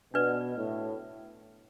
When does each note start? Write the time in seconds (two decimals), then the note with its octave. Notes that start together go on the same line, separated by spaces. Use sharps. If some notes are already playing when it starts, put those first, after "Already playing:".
0.13 B2 D4 B4 D5
0.56 A2